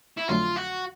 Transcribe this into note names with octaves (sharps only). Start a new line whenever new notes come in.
E4
F2 D3 F#3 A3 F4
F#4